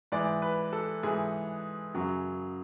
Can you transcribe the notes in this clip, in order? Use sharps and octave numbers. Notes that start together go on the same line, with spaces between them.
G#2 E3 D5
B4
A4
G#2 E3 G#4
F#2 C#3 F#3